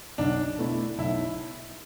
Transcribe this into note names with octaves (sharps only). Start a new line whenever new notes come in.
B1 D4
B2 A3 E4
B1 E4